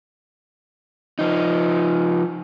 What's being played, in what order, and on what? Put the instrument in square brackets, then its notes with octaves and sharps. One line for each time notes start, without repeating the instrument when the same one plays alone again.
[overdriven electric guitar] F3 D#4